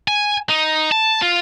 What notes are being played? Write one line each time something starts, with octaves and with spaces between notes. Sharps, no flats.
G#5
D#4
A5
F4